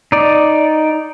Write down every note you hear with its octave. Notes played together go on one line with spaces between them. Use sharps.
D#4 D5